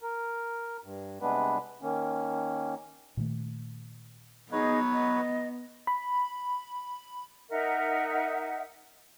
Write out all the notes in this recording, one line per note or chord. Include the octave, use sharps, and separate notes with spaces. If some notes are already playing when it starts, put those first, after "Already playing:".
A#4
G2
C3 G3 G#3 B3 D4 B4
D#3 A#3 C#4
A#2 D#3 A3
F#3 B3 D#4 G#4 B4 C#5 D#5
D#5
B5
D#4 A#4 E5 F#5